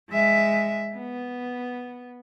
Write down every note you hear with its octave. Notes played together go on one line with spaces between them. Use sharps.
G#3 E5
B3